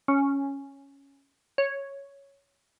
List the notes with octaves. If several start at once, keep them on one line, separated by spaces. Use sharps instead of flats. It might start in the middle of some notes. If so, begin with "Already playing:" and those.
C#4
C#5